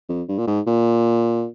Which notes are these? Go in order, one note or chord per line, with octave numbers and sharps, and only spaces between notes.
F2
G2
A#2
G#2
A#2